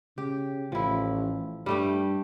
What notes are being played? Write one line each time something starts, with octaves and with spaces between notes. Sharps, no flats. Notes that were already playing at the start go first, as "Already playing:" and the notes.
C#3 G4
A1 F3 E4
G2 G3 A3 G4